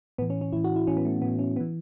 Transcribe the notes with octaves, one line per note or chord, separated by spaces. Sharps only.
A2 E3 B3
C#4
C#4
A2 E3 E4
F#4
E4
A2 E3 C#4
B3
A3
A2 E3 B3
C#4
B3
E3